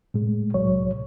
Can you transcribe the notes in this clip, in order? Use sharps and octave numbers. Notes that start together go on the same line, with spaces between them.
A2 G#3
C2 F#3 C#5